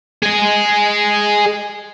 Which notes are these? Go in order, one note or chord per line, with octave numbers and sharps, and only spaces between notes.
G#4 D#5